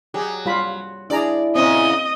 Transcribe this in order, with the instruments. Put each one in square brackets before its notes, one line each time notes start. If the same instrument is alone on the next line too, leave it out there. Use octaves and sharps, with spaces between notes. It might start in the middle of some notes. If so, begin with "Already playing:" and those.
[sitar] F#3 [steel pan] G4 G#4
[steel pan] G3 F4 B5
[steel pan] D4 G#4 A#5 [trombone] E4 [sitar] D5
[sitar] A#2 C#3 C#4 [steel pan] C4 [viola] D#5